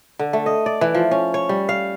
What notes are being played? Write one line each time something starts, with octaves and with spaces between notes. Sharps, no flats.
D3
A3
D#5
D5
E3
F3
C#4
C#5
G3
F5